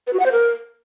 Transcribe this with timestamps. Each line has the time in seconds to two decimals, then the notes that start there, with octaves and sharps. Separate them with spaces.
0.07 B4
0.13 F#4
0.20 F#5
0.26 C5
0.32 A#4